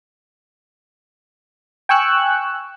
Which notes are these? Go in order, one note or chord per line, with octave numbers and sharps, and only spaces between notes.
G5 G#5 C#6 E6 F#6